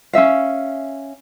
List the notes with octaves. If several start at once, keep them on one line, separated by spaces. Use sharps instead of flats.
C#4 D#4 E5 F5